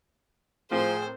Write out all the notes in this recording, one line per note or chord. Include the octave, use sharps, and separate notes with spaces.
A2 F3 C4 G#4 A#4 C5